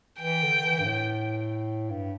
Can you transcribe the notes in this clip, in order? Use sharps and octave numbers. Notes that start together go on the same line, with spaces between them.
E3 G5
D3
E3
G2
A2
G2